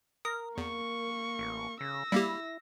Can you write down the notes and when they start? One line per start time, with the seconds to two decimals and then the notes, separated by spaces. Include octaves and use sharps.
0.25 A#4 D#6
0.58 E2 A#3 C#6
1.39 A1
1.81 C#3 E6 A#6
2.12 G3 A#3 E4 G4